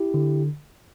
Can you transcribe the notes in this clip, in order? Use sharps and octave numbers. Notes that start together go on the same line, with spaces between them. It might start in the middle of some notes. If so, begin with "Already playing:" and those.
Already playing: E4 G4
D3